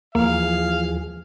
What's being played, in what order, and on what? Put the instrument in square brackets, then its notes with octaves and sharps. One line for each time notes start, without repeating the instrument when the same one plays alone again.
[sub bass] D#2 [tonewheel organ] E3 F3 G#4 [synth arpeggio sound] A#3 [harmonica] F5